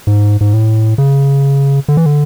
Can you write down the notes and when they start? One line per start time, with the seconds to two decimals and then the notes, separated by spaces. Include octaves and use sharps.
0.07 G#2
0.41 G#2
0.53 A2
0.98 C#3
1.88 D3
1.97 E3
2.06 D3